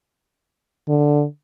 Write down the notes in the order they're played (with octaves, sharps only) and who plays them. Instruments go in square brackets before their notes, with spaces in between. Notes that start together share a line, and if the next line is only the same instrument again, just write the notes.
[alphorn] D3